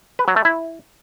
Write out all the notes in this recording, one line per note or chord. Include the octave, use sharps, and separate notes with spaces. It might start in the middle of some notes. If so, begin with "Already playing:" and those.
B4
F#3
A3
E4